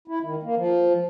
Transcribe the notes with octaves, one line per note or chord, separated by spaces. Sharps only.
E4
D#3
A#3
F3